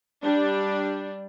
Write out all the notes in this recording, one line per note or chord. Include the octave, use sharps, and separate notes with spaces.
G3 D4